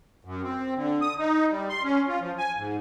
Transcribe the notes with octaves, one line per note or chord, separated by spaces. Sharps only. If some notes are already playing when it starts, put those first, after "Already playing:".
F#2
C4
D3
D#6
D#4
G3
C6
C#4
F4
F3
G#5
G#2